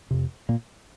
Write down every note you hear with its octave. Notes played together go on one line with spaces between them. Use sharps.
F2 C3
A#2 A#3